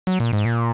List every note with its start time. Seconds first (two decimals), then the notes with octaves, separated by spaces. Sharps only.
0.07 F#3
0.20 A#2
0.33 G#2
0.45 A#2